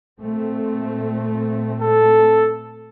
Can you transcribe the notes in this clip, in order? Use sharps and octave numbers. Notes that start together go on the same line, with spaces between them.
A#2 A3 C4
A4